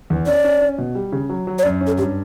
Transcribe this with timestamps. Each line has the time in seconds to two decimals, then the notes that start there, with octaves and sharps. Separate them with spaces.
0.10 E2
0.27 C#4 D5
0.44 C#4
0.61 C#4
0.78 B2
0.95 G3
1.12 C#3
1.29 F#3
1.47 F#3
1.59 C#5
1.63 F#2 D5
1.81 C#4
1.87 A4
1.98 G2 G4